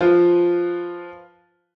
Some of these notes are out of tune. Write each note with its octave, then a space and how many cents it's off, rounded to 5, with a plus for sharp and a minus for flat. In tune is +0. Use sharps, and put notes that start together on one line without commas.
F3 +0 F4 +0 B4 +0